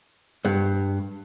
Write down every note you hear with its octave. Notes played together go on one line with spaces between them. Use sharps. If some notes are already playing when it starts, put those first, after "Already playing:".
G2